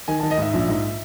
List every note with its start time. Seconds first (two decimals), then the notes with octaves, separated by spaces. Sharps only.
0.08 D#3 G#5
0.19 A5
0.23 D#3
0.31 D#5
0.38 G#2 E5
0.53 A#1
0.68 G#2